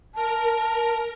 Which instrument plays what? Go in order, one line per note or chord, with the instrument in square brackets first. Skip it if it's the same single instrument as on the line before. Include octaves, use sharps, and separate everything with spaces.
[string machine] A#4 [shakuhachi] A5